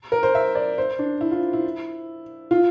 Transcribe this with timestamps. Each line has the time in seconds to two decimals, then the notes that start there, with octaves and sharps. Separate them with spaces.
0.12 A#4
0.23 C5
0.35 E5
0.55 D5
0.78 C5
0.99 D4
1.21 E4
1.31 F4
1.53 E4
2.51 F4